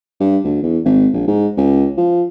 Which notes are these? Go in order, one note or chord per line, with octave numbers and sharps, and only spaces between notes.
G2
D2
E2
G#1
A#1
G#2
C#2
F3